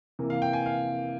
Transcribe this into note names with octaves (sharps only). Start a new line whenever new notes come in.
C3 E3 A#3
F5
G5
G#5
F5